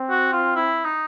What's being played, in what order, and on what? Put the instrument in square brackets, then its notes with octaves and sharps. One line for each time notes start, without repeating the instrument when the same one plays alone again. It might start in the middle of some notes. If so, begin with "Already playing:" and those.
Already playing: [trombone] C4
[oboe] F#4
F4
E4
D#4